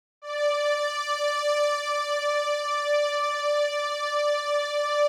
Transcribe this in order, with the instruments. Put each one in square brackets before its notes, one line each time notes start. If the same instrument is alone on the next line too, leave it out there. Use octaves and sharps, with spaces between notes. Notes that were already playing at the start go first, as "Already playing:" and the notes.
[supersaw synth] D5